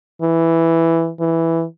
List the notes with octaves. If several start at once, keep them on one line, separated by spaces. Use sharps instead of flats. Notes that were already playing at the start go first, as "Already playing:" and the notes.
E3
E3